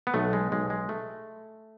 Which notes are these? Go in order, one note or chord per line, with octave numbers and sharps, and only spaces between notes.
B3
B1 A3
G#3
B1 G#3
G#3
A3